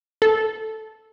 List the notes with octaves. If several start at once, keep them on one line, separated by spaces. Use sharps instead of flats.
A4